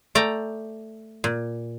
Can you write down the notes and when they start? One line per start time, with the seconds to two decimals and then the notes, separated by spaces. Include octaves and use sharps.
0.15 A3 D5 G5 A#5
1.24 A#2